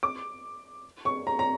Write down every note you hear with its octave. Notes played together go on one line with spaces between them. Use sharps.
D6
C#6
A#5
A#5